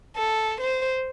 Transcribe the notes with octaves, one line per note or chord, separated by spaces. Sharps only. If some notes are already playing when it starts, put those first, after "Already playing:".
A4
C5